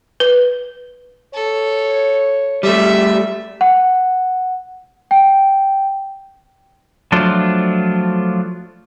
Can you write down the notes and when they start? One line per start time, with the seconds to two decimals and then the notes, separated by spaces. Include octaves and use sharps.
0.20 B4
1.34 A4 C#5
2.63 G3 A3 E5
3.61 F#5
5.11 G5
7.12 F3 F#3 A3 D4 F4